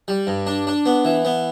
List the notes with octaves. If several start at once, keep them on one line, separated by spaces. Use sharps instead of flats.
G3
G2
D4
D4
B3
E3
B3